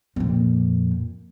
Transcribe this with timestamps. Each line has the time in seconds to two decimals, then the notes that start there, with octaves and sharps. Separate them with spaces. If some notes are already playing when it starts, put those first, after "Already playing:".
0.16 F2 A#2